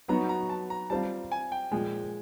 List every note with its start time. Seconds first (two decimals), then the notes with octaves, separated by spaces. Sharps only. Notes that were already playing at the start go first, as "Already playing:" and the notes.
0.08 F#3 B3 D#4 F#4 A#5
0.29 A#5
0.49 A5
0.70 A#5
0.90 G3 C4 F4 A5
1.32 G#5
1.52 G5
1.72 A#2 F3 G#3